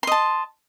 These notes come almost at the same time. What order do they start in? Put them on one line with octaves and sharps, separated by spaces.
C6 D#5 A5